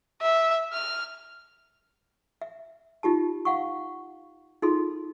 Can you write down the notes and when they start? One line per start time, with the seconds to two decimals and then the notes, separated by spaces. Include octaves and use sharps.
0.22 E5
0.73 F6
2.42 E5
3.03 D#4 F4 G4 A5
3.45 F5 F#5 C#6
4.62 D#4 F4 G#4 A4 C6